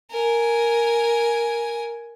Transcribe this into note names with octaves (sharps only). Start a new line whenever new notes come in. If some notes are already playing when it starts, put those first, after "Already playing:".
A#4 G#5